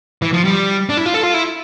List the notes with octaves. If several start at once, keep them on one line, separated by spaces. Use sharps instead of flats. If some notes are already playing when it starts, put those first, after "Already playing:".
E3
F3
G3
D4
E4
F4
A4
F4
E4